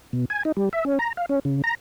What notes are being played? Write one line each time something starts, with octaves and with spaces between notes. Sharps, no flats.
B2
G#5
D#4
G3
E5
C#4
A#5
F5
C#4
C#3
A#5